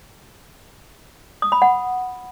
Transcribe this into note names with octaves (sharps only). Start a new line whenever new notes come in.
D#6
B5
F#5